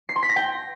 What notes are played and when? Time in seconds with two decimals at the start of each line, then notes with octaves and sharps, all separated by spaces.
0.09 C7
0.16 C6
0.23 B6
0.29 A#6
0.36 G5